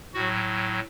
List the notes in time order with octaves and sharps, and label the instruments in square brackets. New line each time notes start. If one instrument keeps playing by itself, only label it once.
[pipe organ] A2 F#3 F#4